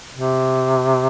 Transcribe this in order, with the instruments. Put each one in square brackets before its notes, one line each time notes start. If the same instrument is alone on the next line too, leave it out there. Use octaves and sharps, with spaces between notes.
[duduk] C3